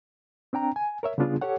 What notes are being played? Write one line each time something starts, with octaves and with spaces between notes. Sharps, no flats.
C4 D4 G5 A#5
G#5
A#4 C#5 E5
C#3 G3 B3 D4 F4 G#4
G4 A4 C#5 F#5